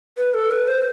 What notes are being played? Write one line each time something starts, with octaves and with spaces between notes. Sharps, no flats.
B4
A4
B4
C5